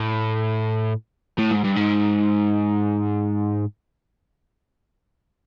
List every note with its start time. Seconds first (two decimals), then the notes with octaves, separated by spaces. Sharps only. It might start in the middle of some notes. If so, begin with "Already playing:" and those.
Already playing: A2
1.38 A2
1.51 G#2
1.64 G2
1.76 G#2